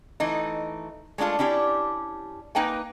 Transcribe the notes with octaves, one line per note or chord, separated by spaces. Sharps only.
E3 A3 D#4
G#3 A3 D4 F4 A4
C#4 D4 E4 G4
A#3 D#4 B4 G5 G#5